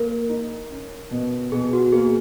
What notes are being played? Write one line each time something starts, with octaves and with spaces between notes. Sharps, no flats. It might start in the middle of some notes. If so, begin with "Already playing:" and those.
Already playing: A#3 A#4
D#4
C#4
B2
B2 G#4
F#4
A#3 G#4
G#4